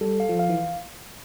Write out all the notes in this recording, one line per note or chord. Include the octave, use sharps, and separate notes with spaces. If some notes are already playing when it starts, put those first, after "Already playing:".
G3 A4
F5
F3
F5
E3